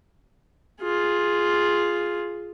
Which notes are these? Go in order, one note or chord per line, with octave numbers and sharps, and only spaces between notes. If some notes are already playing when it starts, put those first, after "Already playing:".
F4 G#4